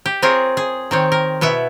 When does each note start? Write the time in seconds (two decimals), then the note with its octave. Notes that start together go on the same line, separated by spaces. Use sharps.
0.06 G4
0.22 C4 F4 G#4 A#4 C#5
0.57 G#4
0.91 D#3 C4 C#5
1.12 A#4
1.41 B2 B3 E4 E5